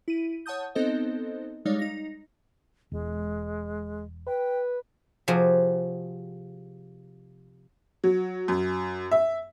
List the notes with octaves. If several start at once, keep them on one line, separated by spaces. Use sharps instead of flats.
E4 D#7
C#5 F#5 A5 D#6 G6
B3 C4 D#4 A4 C5 D#5
G3 G#3 D#4 C#5 D5 F5
D#4 A#6
E1 G#3
B4 G5
C3 F3 F#4 G#4
F#3
F#2
E5